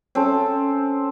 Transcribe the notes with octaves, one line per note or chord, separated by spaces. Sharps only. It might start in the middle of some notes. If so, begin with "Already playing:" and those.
C4 C#4 A4